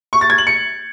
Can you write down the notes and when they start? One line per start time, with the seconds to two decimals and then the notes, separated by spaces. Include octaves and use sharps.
0.13 C#6
0.21 A6
0.30 G#6
0.38 F#7
0.47 C#7